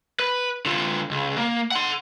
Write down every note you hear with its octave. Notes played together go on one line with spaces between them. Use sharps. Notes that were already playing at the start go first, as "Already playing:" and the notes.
B4
D3 F4
C#2
A#3
F#5 C6